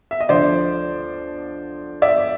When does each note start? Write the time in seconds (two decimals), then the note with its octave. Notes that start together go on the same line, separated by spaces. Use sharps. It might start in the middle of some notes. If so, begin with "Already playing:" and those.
0.11 E5
0.20 D#5
0.29 D2 D3 F3 C5 D5
2.02 D5 E5